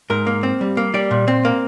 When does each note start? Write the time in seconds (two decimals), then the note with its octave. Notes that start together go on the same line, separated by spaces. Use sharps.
0.10 G#2 A#4
0.27 A#3
0.43 C4
0.61 G3
0.77 A#3
0.94 G3 D5
1.11 A#2
1.28 C4
1.45 A#3